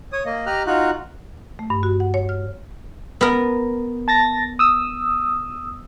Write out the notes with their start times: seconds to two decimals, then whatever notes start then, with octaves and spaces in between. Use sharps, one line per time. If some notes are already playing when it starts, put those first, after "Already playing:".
0.13 C#5 D#6
0.26 A#3 D#5
0.46 G4 D#5 A#5 F6 F#6
0.67 D#4 F4 F#4 F#6
1.59 A3
1.70 G2
1.83 F#4
2.00 F#5
2.14 C#5
2.29 F6
3.21 B3 A#4
4.08 A5 A6 A#6
4.59 D#6 E6